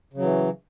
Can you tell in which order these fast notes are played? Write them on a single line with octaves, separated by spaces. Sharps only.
C#3 F#3 E3